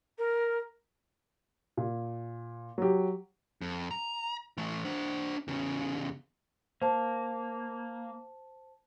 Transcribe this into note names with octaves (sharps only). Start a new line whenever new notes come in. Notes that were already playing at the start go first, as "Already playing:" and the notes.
A#4
A#2
F#3 G4
F2
A#5
E3 A3
D4 C5
E2 C#3
A#3 C5 A5